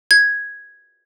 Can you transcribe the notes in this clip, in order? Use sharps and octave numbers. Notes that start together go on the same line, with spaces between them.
G#6